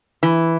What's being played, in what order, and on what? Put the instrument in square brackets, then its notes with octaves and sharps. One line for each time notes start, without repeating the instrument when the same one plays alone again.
[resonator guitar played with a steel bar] E3